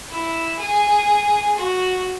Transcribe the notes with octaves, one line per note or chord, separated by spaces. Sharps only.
E4
G#4
F#4